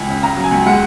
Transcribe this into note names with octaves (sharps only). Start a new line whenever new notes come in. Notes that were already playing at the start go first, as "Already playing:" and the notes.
Already playing: C#2 G#5
C#3
C#3 A#5
F#3
G#5
C#2
G#3 F#5